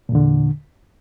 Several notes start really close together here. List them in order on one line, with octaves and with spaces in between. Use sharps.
A#2 E2 D3